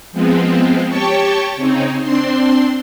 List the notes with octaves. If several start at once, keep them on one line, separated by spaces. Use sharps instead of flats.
F3 G#3 B3 C4
G4 C#5 G5 A5 C#6
C#3 C4 C#4 D#4
C4 D4 C6